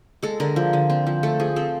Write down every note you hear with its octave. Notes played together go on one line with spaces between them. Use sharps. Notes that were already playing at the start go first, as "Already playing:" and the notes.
G#3 A4
D3 A#4
F3
D3
C4
F3
A3 A4
F3 G#4
C4 A4